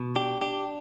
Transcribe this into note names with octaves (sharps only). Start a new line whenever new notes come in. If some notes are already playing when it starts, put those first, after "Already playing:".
Already playing: B2
D4 G4
D4 G4